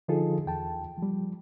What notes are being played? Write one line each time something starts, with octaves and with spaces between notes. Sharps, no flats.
D3 F3 D#4 F4 G#4 A4
E2 G5 A5
F3 G3